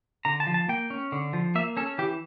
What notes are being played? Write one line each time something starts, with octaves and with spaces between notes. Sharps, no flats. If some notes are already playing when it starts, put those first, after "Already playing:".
D3 A#5
A5
F3
A5
A#3 G5
C#4
D3
F3
A#3 E5
C#4 A4
E3 G4